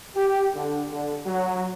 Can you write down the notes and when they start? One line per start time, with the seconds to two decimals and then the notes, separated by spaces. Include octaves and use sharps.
0.16 G4
0.54 D3
0.91 D3
1.26 F#3